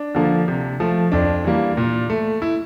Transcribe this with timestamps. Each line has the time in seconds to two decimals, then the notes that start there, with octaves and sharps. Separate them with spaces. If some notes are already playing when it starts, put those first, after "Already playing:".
Already playing: D4
0.15 D3 F3 A#3
0.48 C3
0.80 F3 A3
1.12 F2 D4
1.44 E3 G3 A#3
1.77 A#2
2.10 A3
2.42 E4